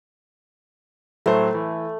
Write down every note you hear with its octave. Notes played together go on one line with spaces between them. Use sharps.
A2 F#3 A3 C5
E3